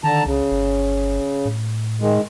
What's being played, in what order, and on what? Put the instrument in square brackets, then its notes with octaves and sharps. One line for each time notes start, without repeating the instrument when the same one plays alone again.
[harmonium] D3 A5 A#5 [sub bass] D#3
[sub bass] C2 [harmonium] C#3
[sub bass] G1
A2
[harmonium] D#3 G#3